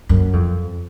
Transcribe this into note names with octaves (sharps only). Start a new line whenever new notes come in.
F#2
F2